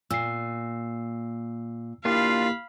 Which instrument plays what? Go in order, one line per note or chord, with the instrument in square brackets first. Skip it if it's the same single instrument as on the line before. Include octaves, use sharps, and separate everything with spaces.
[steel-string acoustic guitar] A#2 [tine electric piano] E6 C7
[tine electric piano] A#3 E4 G4 [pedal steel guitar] D4 F4 [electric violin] F5 B5